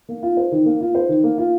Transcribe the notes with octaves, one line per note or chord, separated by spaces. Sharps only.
A#3
F4
C5
D#3
A#3
F4
C5
D#3
A#3
F4